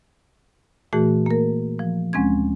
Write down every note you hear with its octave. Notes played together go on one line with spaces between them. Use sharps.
A#2 E3 A3 F#4 G#4
A#3 A#4
F3
D2 G#3 C4 C#4 G#6